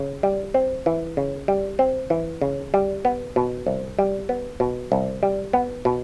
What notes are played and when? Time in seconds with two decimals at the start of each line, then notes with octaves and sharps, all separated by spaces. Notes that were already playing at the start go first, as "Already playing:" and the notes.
Already playing: C#3
0.23 G3
0.54 C4
0.86 E3
1.17 C#3
1.48 G3
1.79 C4
2.10 E3
2.41 C#3
2.74 G3
3.05 B3
3.36 B2
3.66 C2
3.99 G3
4.29 B3
4.60 B2
4.92 C2
5.23 G3
5.53 B3
5.85 B2